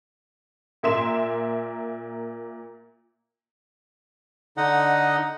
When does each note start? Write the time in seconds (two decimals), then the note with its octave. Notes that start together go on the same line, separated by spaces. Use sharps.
0.83 A#2 A#3 E5 C6 E7
4.57 D3 D#4 D#5 F#5